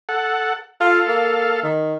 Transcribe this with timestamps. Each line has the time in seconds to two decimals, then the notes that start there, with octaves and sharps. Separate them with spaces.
0.09 A4 F#5
0.81 F4 A4 F5
1.08 A#3
1.63 D#3